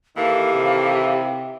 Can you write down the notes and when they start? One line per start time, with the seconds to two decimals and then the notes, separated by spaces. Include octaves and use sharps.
0.17 A2 D#3 E3 A#3 G4 F5
0.54 C3